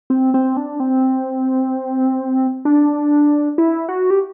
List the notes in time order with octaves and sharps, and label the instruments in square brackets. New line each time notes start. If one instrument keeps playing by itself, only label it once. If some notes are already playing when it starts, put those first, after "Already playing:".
[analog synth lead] C4
C4
D4
C4
D4
E4
F#4
G4